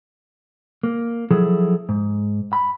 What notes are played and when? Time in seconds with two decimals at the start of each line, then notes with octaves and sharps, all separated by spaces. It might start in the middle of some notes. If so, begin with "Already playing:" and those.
0.83 A#3
1.31 F3 F#3 E4 G#4 A4
1.89 G#2
2.53 B5